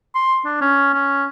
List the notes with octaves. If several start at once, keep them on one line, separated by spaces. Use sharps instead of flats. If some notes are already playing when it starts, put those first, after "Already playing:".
C6
D4
C#4
C#4